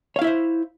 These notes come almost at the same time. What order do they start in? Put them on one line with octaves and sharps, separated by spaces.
C#5 F5 E4 E5 C5